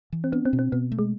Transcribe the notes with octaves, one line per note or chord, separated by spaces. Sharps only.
E3
C4
B3 D4
C4
B2
C4
B2 B3
A3
G#3